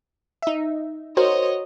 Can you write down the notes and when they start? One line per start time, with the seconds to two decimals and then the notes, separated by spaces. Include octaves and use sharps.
0.42 D#4 E5
1.17 F#4 A#4 C5 C#5 D#5